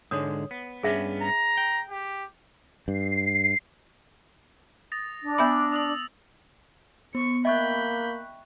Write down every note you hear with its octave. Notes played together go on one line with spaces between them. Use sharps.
G#2 D3 G#3 C#5 D#6
B3
G2 B3 C#4 G#4 E5
A#5
G5
G4
G2 C7
D#6 A6 A#6
D4
B3 E5 B5 E6
D#6 F7 F#7
B3 C#6 C#7
A#3 D#5 E5 G5 B5 C#6 F#6 G6